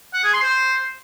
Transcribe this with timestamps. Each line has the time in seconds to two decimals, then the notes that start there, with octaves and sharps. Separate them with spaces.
0.14 F#5
0.23 G#4
0.33 C6
0.43 C5